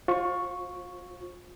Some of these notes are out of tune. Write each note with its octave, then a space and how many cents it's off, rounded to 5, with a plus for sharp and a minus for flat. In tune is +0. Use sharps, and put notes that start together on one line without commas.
F4 +30 C5 +25 C#6 +0